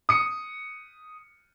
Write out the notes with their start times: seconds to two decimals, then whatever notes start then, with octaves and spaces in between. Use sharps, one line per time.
0.09 D#6 C#7